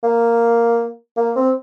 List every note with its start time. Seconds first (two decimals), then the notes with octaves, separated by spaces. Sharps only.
0.03 A#3
1.17 A#3
1.36 C4